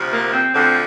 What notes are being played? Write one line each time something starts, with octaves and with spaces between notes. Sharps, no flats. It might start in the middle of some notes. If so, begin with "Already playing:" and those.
Already playing: D2 C3 F3
A#3
C4
D2 D3 F3 C4